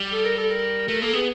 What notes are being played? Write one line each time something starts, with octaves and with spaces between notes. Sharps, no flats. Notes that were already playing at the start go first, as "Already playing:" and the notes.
Already playing: G3
A4
A#4
A4
A#4
A3 A#4
A#3 A4
B3 G#4